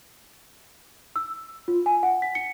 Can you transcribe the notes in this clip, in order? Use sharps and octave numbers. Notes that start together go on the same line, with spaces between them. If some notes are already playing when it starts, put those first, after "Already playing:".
E6
F4
G#5
F#5
B6
C#7